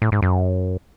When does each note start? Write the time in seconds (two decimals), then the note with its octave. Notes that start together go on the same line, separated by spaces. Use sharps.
0.02 A2
0.12 G#2
0.22 F#2